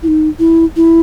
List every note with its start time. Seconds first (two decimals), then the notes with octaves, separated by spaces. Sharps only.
0.03 E4
0.08 D#4
0.39 E4
0.76 E4